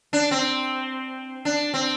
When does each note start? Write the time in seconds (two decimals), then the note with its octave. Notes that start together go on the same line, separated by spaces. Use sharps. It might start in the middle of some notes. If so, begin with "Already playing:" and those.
0.13 D4
0.31 C4
1.45 D4
1.74 C4